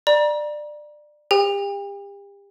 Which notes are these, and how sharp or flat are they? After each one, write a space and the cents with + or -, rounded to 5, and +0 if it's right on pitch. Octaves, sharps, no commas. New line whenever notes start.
D5 +20 A#5 +35
G4 +35 G5 +40